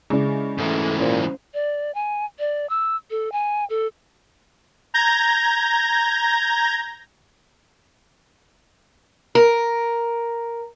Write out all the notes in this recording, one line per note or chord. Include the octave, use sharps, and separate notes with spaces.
C#3 G#3 E4 D5
G#2 E3 A3
A#2 C#4 C5
D5
G#5
D5
E6
A4
G#5
A4
A#5 G6 G#6 A#6
A#4